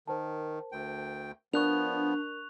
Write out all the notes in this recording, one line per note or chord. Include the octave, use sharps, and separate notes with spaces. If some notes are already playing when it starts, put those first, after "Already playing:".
D#3 A#4 C5 A5
D2 G5
F3 B3 D4 A#4 C#6 F#6 F7